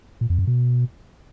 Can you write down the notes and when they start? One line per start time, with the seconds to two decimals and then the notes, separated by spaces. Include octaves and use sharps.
0.21 A#2
0.30 F2
0.39 F#2
0.47 B2